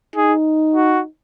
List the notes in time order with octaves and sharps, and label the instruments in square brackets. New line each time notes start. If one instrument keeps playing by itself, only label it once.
[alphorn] D#4 [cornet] G#4
[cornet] F#4